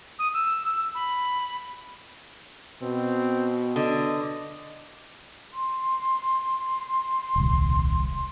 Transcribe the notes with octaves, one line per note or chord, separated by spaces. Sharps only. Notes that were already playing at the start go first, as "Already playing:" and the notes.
D#6
E6
B5
B2 C4
D3 D#5
C6
D#1 C2